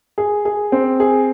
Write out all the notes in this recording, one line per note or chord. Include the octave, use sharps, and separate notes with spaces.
G#4
G#4
C4
G#4